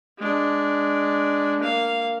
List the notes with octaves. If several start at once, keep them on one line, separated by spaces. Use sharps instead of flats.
G#3 D4
A#3 F5